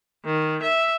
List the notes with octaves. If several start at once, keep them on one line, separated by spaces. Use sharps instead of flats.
D#3
E5